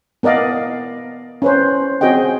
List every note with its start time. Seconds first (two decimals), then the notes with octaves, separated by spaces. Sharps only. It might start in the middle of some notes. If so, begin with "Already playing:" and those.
0.23 B3 A#4 D5 D#5 F5
1.42 C#4 B4 C5
2.01 C4 F#4 G#4 D#5 G5